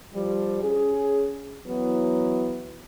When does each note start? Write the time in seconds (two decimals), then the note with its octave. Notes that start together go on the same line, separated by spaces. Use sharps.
0.14 F3 G3
0.62 C#4 G#4
1.67 E3 F#3 B3